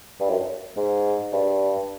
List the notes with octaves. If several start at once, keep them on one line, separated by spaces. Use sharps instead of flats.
G2
F#2
G#2
G2